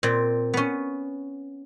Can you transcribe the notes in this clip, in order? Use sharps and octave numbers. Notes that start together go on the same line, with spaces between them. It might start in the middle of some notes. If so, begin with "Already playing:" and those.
A#2 C4
B3 C#4